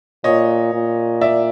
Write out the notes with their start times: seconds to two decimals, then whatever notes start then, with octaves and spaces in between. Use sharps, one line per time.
0.24 A#2 C#5 D#5
0.73 A#2
1.21 D5 E5